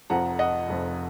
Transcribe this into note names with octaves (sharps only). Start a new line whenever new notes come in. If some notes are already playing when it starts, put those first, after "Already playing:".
F1 F2 F3 F#5 A#5
D#5 F#5
F1 F2 F3